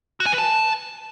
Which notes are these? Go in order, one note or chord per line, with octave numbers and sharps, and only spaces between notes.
F#4
G#5
B4
A5